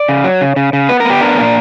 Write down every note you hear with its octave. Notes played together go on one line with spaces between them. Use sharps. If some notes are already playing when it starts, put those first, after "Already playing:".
Already playing: D5
C#3
F#3
C#3
C#3
C#3
B3 B4
B3 A#4
G4
D4 A#4
A#2